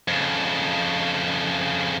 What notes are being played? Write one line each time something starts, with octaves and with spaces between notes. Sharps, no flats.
F2 C#3